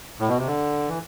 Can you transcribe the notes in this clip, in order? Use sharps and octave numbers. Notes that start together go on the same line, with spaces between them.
A2
B2
C3
D3
E3